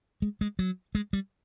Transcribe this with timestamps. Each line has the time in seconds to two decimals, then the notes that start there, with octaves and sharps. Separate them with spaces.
0.22 G#3
0.41 G#3
0.59 F#3
0.95 G#3
1.13 G3